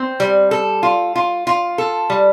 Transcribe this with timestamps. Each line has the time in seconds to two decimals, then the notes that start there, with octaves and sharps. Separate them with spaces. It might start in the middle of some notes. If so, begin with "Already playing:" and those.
Already playing: C4
0.20 G3
0.51 A4
0.83 F4
1.16 F4
1.47 F4
1.78 A4
2.10 G3